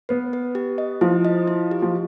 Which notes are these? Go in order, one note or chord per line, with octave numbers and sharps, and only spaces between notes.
B3 B4
B4
G4
D#5
F3 E4
D#5
E4
G4
F3